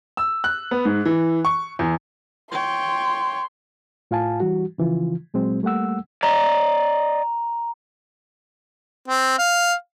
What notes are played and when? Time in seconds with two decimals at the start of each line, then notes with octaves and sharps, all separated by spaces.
0.17 E6
0.44 F#6
0.71 B3
0.85 G#2
1.05 E3
1.45 C#6
1.79 E2
2.51 C#5 G5 C6
4.11 A2 F4 F5 G#5 A5
4.40 E3 G3 F#4
4.78 C#3 E3 F3 F4
5.34 A#2 F#3 G#3 C4
5.63 G3 A3 A#3 F#5 E6
6.23 D5 D#5 A#5
9.08 C4
9.38 F5